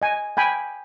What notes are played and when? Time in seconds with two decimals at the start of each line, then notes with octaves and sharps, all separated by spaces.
0.02 D#5 G#5
0.37 G5 G#5 B5